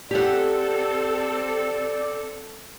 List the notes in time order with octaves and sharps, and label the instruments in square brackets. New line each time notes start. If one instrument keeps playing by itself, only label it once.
[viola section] C4 A4 [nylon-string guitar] G4 F#5 [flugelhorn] D5